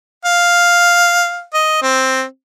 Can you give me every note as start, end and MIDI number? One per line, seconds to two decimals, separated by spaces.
0.25 1.44 77
1.54 1.79 75
1.82 2.23 60